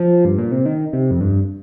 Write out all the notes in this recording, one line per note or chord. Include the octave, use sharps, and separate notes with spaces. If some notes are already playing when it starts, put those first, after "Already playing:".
Already playing: F3
G2
A#2
C3
D#3
C3
F2
G2